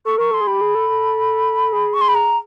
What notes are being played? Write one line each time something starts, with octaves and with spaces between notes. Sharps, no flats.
A4 C#6
A#4 C#6
A4 C6
G#4
G4 B5
G#4
A4
A4
G#4
C#6
C6
B5
A#5